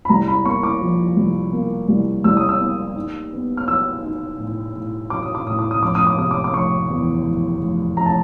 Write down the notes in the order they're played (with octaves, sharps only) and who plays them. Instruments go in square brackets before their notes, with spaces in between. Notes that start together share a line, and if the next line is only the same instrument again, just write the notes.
[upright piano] B5
C2 A#5
B5
A#3 C#6
D6
F3
C2
A#3
C2
C2 E6
D#6
E6
A#3
D#4
B3
F6
F#3 E6
D#4
A2
A2
F#3 D6
D#6
D6
A2 D#6
D6
D#6
F1 D6
D#6
D6
C3 D#6
D6
D6
F1 C#6
E2
F1
F1
F1 A#5
A5